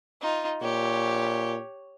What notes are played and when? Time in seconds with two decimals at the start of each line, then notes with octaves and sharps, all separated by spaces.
0.21 D#4 F4
0.62 A#2 G4 C#5